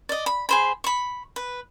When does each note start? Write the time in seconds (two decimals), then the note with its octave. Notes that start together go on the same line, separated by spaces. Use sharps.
0.09 D5 D#5
0.26 B5
0.49 G#4 C5 B5
0.84 B5 C#6
1.36 B4